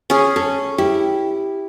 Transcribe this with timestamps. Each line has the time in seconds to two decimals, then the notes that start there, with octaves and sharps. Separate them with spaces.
0.10 C#4 G#4
0.36 C#4 A4
0.78 E4 G4